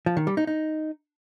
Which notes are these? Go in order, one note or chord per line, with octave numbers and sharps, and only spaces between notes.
F3
D#3
G3
D#4
D#4